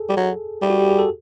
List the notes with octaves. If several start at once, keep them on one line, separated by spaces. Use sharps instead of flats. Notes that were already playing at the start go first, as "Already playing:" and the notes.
Already playing: G#4 A4
G3
F#3
G3
F#4
G4
G#4
A4